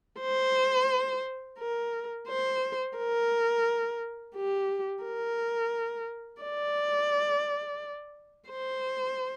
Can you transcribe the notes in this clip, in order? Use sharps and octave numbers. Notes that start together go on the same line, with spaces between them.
C5
A#4
C5
A#4
G4
A#4
D5
C5